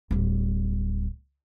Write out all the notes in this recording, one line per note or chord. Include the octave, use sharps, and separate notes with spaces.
D1 G3